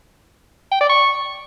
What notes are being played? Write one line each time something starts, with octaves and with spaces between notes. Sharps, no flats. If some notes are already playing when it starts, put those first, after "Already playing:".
G5
D5
C#6